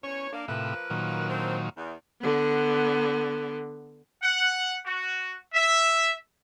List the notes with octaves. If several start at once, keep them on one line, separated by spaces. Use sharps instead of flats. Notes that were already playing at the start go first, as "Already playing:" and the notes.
E2 C#4 C#5
A#3 D4
A2 C3 F3 A#3 B4 E5
A#2 D#3 F#3
D3 C4
E2
D3 B3
F#5
F#4
E5